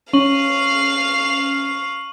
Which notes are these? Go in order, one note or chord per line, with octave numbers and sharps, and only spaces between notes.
C#4 F5 C#6 F7 F#7